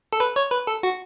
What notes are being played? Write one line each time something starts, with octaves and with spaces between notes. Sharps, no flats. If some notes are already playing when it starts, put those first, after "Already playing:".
A4
B4
C#5
B4
A4
F#4